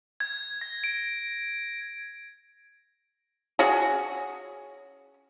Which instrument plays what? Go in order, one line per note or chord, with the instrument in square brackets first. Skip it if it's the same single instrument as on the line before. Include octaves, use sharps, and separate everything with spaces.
[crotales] G#6
A#6
D7
[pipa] C#4 F#4 G#4